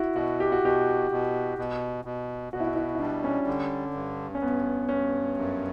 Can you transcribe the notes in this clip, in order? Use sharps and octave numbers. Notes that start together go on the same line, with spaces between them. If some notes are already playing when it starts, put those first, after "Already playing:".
Already playing: E4 F#4
B2 F#4
G4
F#4
B2 G4
B2
B2
B2
B2 F#4
E4
F#4
E4
E4
G3 D4
C#4
D3
G2
C#4
G2 B3
G2 C#4
F#2